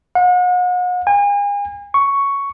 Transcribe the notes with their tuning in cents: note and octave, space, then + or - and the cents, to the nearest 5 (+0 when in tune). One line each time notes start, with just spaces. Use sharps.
F#5 -40
G#5 -40
C#6 +5